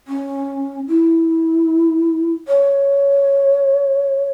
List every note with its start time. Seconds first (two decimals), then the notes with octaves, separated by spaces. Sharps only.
0.07 C#4
0.88 E4
2.48 C#5